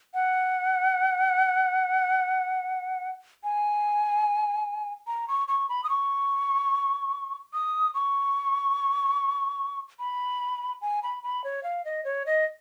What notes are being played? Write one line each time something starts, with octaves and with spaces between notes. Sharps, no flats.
F#5
G#5
A#5
C#6
C#6
B5
D#6
C#6
D#6
C#6
B5
G#5
B5
B5
C#5
F5
D#5
C#5
D#5